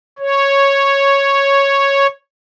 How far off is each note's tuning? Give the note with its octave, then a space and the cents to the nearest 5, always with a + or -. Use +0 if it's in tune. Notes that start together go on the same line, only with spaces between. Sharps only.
C#5 -5